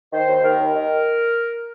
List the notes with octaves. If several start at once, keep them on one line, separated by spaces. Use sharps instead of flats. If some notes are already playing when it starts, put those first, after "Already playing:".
D#3 C5
D#2
D#3 A#4
D#2
D#3